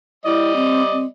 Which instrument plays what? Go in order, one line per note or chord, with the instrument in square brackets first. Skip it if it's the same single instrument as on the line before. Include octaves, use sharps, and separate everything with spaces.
[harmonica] G3 D5 D#5 [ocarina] E4
[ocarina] C4
C4